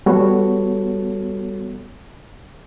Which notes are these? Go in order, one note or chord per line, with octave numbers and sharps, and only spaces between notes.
G3 B3 F#4 A4 C#5